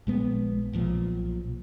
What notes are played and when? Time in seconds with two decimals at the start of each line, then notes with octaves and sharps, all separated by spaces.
0.07 A#1 G#3 B3
0.73 B1 A#2 F3